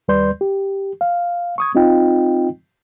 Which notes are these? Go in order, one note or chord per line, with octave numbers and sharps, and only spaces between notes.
D#2 G3 B4 D5 C6 G6
G4
F5
C#6 D#6 G#6
C4 D#4 F4 D#5 G5